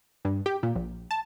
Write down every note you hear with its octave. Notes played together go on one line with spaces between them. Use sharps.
G2
G4
A#2
A#1
A5